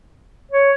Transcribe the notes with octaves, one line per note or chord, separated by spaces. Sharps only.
C#5